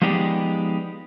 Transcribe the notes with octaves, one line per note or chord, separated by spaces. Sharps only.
F3 G#3 B3 D#4 G4 D5